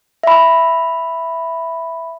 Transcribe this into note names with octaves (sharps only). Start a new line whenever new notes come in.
E5 B5